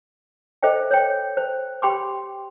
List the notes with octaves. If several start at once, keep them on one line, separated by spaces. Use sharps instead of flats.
A4 C5 D#5 E5 G5
C#5 G5
C5
G4 G5 B5 C6 D6